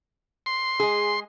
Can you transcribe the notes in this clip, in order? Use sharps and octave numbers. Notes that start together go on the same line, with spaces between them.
C6
G#3 G#4